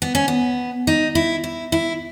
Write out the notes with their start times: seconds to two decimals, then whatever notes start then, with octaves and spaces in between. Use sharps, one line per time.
0.02 B3
0.15 C#4
0.28 B3
0.87 D#4
1.15 E4
1.44 E4
1.72 E4